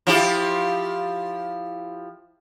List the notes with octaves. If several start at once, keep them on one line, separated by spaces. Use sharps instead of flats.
F3 E4 G4